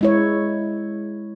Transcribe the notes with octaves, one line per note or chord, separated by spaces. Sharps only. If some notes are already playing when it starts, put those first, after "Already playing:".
G#3 E4 C#5